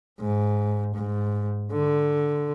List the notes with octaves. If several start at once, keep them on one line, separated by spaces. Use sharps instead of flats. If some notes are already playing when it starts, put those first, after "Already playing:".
G#2
G#2
D3